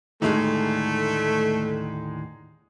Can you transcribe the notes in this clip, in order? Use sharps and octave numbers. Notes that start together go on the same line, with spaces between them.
D#2 A2 D3 G#3 A3 D#4